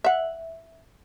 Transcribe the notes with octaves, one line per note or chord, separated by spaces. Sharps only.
E5 F#5